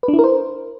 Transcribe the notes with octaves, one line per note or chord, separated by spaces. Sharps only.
B4
D4
E4
A#4
C5